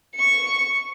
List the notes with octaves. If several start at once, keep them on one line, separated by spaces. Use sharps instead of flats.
C#6 C#7